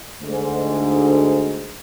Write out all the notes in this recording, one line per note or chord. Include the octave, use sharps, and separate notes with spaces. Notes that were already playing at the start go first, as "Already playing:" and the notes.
D2 G#2